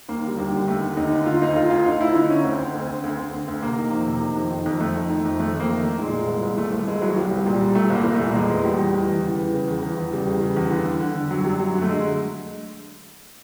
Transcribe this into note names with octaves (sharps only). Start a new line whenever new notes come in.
D#2 A#3
D3 G3
D#2
D3 G3
D#2 A3
D3
D#2 D#4
D3
D3 F4
D2 D#4
D2 F4
D2 F4
D2 D#4
D2 E4
D3 D#4
D3 C#4
D2 C4
D3
D2
D3
D2
D2
D3
D2
C3 A#3
D#3
F2
C3
D#3
F2
D#3
F2
F2 A3
D#3
D#3
F2
F2 A3
F2 A#3
D#3
D#3 A3
A#2 G#3
A#2
C2
C2
C2 A3
C2 A3
C2 G#3
C2 F#3
C2 G3
C2
A#2 G3
A#2 G3
A#2 A3
C2 A#3
C2
A3
A#2
E2 G#3
E2
E2 G3
E2
E2
E2
C#3
E3
C#3
E2
E2
E2
C#3 G3
E2
C#3
E2
D3
D3
D3
D3
F#2 F#3
F#2 G3
F#2 F#3
D3
A3
D3 G#3